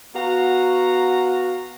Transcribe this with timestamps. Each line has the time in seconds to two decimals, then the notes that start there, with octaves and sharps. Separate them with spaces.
0.15 B3 F#4 F5 A#5